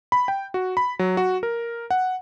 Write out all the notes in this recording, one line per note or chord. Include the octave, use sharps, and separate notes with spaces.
B5
G5
F#4
B5
F#3
F#4
A#4
F#5